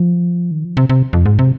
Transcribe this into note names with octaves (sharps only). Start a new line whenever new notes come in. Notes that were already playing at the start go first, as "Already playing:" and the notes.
Already playing: F3
D#3
F3
C3
C3
F2
G#2
C3